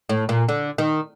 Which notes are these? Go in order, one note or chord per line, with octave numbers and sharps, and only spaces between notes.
A2
A#2
D3
D#3